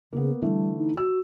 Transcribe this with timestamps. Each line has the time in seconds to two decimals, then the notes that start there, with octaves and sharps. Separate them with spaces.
0.13 C#3 A#3 B3
0.42 D3 E3 G3 A3
0.78 D#4
0.97 F#4 E6